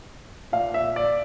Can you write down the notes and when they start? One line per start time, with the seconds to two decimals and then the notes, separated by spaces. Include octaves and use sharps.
0.52 A#2 F5
0.74 E5
0.96 D5